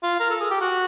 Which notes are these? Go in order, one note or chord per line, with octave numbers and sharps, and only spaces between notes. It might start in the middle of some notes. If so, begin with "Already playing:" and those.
F4
A#4
A4
G#4
G4
F#4